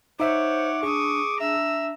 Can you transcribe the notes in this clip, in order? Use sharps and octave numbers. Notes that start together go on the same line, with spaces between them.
D#4 C5 C#5 E5 F#5 D6
D4 G#4 C#6 D#6
D4 E5 A#5 E6